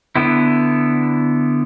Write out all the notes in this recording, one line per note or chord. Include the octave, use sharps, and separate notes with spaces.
D3 B3 E4